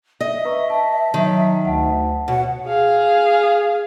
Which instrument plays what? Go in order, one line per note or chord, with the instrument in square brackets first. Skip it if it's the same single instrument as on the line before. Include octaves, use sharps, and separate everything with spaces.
[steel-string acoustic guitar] D#5 [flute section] E5
[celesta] B4 A#5 C#6
A5
[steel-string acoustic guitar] D#3 [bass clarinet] F#3
[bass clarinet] D2 [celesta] F#5 A5
[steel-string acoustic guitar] B2 [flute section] C#5 F#5
[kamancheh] G#4 F5